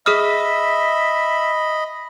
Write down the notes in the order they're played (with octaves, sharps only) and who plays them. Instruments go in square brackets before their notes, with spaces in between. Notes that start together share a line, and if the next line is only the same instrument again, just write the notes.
[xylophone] G#4 D#6 F6 [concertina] D#5 B5 [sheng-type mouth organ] E5